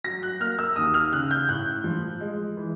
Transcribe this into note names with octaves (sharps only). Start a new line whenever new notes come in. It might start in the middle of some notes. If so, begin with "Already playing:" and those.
F#3 A#6
F#6
A#3 F6
E6
D#2 D#6
F6
C#3 F#6
G6
A2 F#6
F3
G#3
E3